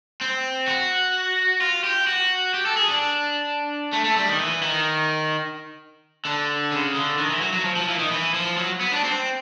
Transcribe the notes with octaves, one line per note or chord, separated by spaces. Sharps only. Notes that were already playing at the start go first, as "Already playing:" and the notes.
C4
F#4
F4
G4
F#4
G4
A4
G#4
D4
A3
A3
G3
D#3
E3
D#3
D3
C#3
D3
D#3
E3
F#3
F#3
F3
F3
E3
D#3
E3
F3
F#3
B3
D4
C4